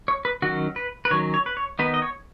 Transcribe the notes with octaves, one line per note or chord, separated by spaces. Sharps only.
C#5
B4
D#3 F#3 C#4 F#4
B4
B4
D#3 F#3 C#4 C#5
C#5
B4
C#5
D#3 B3 D#4 B4
D#5
C#5